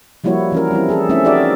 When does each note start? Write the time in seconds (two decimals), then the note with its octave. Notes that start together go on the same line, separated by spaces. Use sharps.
0.24 F3 G3 A#3 E4 F#4 C#5
0.52 E3 C#4 A#4
0.71 G3 C4 E4
0.89 C#4 G#4 A4
1.09 A3 C4 C#4 D#4 E4 E5
1.24 D#4 F#4 G#4 A#4 D5 E5